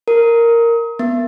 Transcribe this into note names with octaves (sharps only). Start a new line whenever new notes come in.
A#4
B3